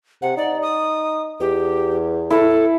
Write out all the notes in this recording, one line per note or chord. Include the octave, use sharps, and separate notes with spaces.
C3 F#5
D#4 D5
D#6
E2 G4
E4 A4